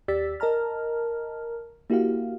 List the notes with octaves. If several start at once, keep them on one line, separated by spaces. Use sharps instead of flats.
D#2 G4 D5 E6 A6 B6
A#4 D#5 A5 A#5 F6
A#3 E4 F#4 G4 F5